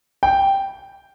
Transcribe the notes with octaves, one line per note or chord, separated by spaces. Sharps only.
G5